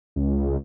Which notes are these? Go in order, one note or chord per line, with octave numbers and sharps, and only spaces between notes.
C#2